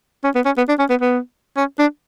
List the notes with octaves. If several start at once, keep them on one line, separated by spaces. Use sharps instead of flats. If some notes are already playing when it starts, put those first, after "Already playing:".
C#4
B3
C#4
B3
D4
C#4
B3
B3
C#4
D4